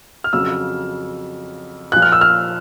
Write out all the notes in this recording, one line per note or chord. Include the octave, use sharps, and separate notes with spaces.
F6
F2 C#3 F#3 E6
A#2 F3 F#6
F6
E6
F6